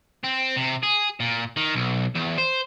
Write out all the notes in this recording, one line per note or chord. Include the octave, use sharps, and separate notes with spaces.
C4
C3
G#4
A#2
D#3
B1
E2
C5